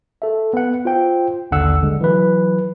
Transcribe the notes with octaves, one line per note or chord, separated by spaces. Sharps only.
A4 E5
B3 F#5
F4 C5 G5
A1 D#2 D3 F#5 E6
D3 G#3
E3 F#3 B4